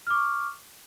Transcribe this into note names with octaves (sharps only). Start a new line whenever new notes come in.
C#6 D6 F6